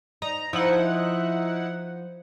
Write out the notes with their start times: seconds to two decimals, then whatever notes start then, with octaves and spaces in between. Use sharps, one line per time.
0.22 D#4 A#5
0.53 F3 D#4 E4 F#5